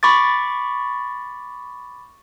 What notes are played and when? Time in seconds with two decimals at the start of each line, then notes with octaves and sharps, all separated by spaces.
0.03 B5 C#6 D6 A6